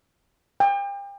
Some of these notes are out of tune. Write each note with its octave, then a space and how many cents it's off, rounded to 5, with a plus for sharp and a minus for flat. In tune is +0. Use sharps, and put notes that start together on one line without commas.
G5 +35